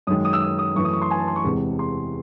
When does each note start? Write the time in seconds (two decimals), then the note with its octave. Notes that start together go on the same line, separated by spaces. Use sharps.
0.07 F#2 D#6
0.10 D#3 G#3
0.25 D#6
0.33 E6
0.42 D#6
0.59 D#6
0.75 F#2 E3 A3 C#6
0.85 D#6
0.93 C#6
1.02 C6
1.11 G#5
1.18 A5
1.27 C6
1.36 C#6
1.44 E2 C3 E3 G#3
1.79 C6